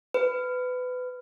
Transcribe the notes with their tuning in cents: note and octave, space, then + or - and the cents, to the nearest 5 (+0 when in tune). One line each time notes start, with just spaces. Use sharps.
B4 +25